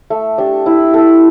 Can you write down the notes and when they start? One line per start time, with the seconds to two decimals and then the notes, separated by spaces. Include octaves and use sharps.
0.10 A3
0.38 D4 G4
0.66 E4
0.94 A4 E5